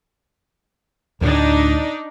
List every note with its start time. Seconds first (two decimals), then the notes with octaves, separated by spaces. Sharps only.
1.21 D2 A2 D4 D#4